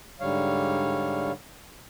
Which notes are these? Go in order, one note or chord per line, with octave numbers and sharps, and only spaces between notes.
G#2 D3 G3 C#5 F5